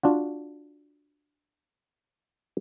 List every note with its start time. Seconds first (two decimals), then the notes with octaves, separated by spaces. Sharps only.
0.03 D4 F4 F#4